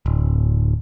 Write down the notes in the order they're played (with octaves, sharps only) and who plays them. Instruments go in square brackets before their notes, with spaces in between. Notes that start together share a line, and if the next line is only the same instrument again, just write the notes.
[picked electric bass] D1